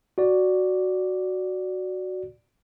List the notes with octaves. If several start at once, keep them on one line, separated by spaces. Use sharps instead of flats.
F#4 D5